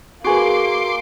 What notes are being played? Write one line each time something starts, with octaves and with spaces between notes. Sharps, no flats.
A#3 F#4 G#4 B4 C6 D6